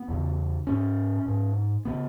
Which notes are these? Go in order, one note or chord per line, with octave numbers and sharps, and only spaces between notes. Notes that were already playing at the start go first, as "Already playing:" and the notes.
Already playing: B3
E2 C#3
G#2 C#4
G#2
C#3 B3